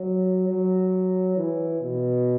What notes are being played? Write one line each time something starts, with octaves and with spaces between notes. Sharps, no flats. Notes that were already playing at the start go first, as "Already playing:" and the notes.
Already playing: F#3
F#3
E3
B2